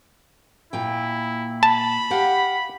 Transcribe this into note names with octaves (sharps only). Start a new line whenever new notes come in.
A#2 E4 G5
A5 B5
G4 F5 F#5